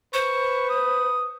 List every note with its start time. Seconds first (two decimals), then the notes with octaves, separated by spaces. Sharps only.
0.14 B4 C5 C#6
0.70 D#6